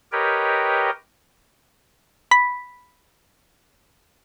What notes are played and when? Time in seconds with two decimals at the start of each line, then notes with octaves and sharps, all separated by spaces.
0.12 G4 A#4 B4 C#5 D#5 G5
2.31 B5 B6